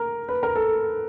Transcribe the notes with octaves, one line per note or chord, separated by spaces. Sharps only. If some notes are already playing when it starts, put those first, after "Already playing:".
Already playing: A#4
B4
A#4
A4